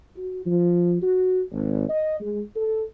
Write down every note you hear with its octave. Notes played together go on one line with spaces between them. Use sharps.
F#4
F3
F#4
G#1
D#5
G#3
A4